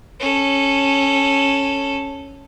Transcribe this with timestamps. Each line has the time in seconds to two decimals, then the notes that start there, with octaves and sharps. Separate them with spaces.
0.20 C#4 A4